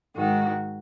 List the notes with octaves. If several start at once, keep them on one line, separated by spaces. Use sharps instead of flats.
G#2 D#3 F#4